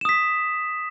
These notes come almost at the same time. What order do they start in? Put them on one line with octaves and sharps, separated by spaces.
E7 D#6 B6